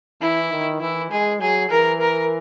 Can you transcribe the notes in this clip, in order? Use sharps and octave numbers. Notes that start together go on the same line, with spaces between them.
E3 E4
D#3
E3 E4
G#3 G#4
F#3 G#4
E3 A#4
A#4